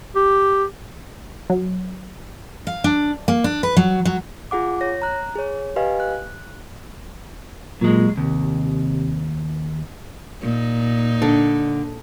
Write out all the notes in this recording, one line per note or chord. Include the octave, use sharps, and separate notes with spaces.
G4
F#3
F5
D4
A#3
D4
B4
F#3
F#3
F4 G#4 F#5 D6
C#5 A#6
A#5 F#6
G#4 C#5
G4 B4 D#5 F5 G#5
F#6
A#2 F#3 G#3
D#2 C3
A#2 D#4
D3